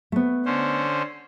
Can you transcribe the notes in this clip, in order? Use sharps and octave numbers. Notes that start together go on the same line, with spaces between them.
A3 B3
D3 C#4 C5